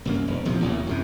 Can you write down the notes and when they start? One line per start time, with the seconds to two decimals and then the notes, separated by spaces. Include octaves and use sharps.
0.05 C2 F#2 A#3
0.28 E1
0.45 A#1 E2 C3 F3
0.62 A1 D#2 A#2
0.87 F#2 C3 E3